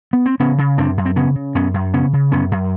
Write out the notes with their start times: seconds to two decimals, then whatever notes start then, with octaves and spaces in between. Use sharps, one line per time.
0.13 B3
0.26 C4
0.40 C#3 B3 C#4
0.58 C#3
0.78 F#2 C4 D4
0.97 F#2
1.06 C4
1.16 C#3 B3 C#4
1.35 C#3
1.55 F#2 B3 C#4
1.74 F#2
1.93 C#3 B3 C#4
2.13 C#3
2.32 F#2 B3 C#4
2.52 F#2